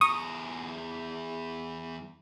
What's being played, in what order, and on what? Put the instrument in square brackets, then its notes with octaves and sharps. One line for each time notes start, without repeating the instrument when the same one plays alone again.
[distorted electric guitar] E2 A#5 [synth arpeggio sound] C#6 D#6